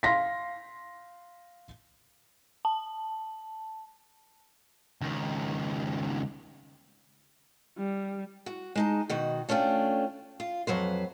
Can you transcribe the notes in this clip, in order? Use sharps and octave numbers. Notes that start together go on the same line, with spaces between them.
F5 C6 A#6 B6
A5
C#2 D#3
G3
F#4
G#3 D#4 A5
B2 D#3 F#4
A3 C#4 D4 F4 G5
F4
F2 F#3 B4 C5